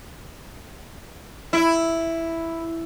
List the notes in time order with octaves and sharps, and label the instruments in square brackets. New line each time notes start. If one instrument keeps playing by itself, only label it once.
[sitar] E4